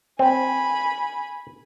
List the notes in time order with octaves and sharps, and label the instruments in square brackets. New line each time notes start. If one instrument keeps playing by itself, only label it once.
[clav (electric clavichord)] C4 [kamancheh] G#5 B5